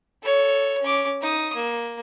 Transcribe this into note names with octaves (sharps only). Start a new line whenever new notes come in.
A4 C#5
C#4 D6
D#4 D#6
A#3